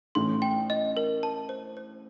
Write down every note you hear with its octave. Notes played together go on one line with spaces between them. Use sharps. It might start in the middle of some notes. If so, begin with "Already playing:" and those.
A1 A2 C6
G5
D#5
A#4
A5
C5
C5